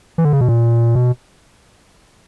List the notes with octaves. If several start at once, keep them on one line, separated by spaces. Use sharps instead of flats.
E3
D3
C#3
B2
A#2
B2